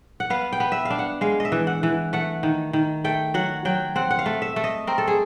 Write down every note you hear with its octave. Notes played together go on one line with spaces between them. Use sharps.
F#5
B3 F5
G5
B3
E5
F5
D4
F#5
G#3 F5
D#5
E5
E3
F#5
E3
A3 F#5
D#3
D#3
A3 G5
F#3 F#5
F#3 G5
C4 F#5
F#5
F5
A3
E5
A3
D#5
C4 A#4
A4
G#4